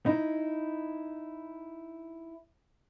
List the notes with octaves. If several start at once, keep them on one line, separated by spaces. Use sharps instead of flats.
D#4 E4